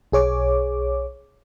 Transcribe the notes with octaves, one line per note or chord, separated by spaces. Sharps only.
B1 G#4 C#5 D6